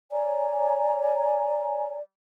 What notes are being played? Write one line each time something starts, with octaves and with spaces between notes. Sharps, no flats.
C#5 D5 G#5 A#5